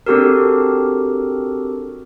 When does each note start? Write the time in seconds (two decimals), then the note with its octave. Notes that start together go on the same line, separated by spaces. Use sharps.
0.06 C4 D4 F#4 G4 A4 A#4